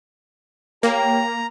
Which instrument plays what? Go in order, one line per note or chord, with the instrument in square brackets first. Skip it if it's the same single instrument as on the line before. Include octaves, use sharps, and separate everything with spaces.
[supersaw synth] A#3 [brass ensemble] G4 C#5 G5 [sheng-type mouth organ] A#5